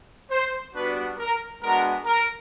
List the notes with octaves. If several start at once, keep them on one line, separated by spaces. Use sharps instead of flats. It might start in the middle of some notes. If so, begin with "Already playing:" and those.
C5
G3 B3 D4 F#4 B4
A#4
G#3 B3 D4 F#4 A#4
A#4